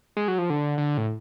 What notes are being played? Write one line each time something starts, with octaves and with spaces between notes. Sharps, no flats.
G#3
F#3
F3
D3
D3
A2